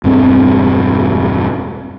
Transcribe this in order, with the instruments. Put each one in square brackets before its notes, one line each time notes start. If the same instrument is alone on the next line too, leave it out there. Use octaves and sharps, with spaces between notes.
[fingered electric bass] E1 G2 C4